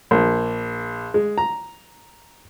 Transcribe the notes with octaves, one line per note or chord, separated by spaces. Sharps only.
A#1
G#3
A#5